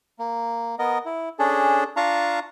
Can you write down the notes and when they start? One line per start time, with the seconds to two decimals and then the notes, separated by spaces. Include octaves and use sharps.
0.19 A#3
0.79 B3 A#4 D#5
1.05 E4
1.39 C#4 D4 G#4 A4
1.97 D4 F4 F5 A5 A#5 C#6